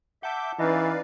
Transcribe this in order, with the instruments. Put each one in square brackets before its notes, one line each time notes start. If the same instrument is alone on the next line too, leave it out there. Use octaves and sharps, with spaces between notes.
[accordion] E5 D6 G6 [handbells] F#5 A5
[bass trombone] E3 [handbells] C#4 D#4 D#5 [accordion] B4 D5 F5